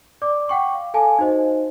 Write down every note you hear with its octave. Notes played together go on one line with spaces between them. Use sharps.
D5 D6
F#5 G5 C#6 D6
F5
A4 F5 G#5 A5
D#4 F#4 C5 D#5